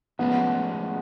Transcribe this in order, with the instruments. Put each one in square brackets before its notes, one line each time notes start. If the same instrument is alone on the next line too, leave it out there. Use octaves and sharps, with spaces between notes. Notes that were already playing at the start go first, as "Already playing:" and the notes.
[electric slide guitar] A2 F3 G#3 C#4 [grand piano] B3